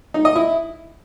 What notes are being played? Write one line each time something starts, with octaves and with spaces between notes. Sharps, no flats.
D#4
D#5
E4